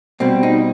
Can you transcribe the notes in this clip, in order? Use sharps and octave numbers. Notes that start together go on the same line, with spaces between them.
B2 G3 C4
D#4